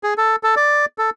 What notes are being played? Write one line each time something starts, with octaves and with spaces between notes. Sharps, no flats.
G#4
A4
A4
D5
A4